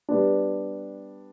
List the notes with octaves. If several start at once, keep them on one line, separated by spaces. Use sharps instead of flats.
G3 B3 D4